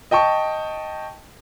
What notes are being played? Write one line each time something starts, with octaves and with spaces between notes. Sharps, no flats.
D#5 G5 A5 C#6